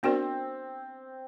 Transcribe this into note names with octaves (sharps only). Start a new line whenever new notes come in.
B3 C4 D4 F#4 A#4 D5